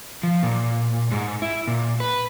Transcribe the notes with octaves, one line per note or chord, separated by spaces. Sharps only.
F3
A#2
G#2
E4
A#2
B4